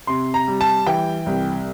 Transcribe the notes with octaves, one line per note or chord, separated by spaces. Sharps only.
C3 C6
A#5
G3
A5
E3 G5
C2